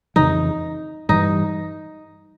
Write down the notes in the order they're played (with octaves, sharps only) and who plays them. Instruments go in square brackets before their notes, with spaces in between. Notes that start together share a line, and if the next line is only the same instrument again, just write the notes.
[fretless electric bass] F2 C#3 E3 [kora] D#4
[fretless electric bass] G2 E3 G3 [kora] D#4